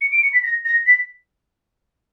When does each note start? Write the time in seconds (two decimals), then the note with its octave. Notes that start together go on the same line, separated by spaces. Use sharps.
0.01 C#7
0.12 D7
0.23 C#7
0.33 B6
0.44 A#6
0.65 A#6
0.87 B6